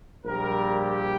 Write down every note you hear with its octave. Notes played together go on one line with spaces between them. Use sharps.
A#1 A#2 G3 A#3 A#4
G4